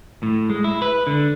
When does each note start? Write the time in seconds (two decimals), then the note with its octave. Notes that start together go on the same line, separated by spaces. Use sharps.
0.23 A2
0.50 G#3
0.64 E4
0.82 B4
1.07 D3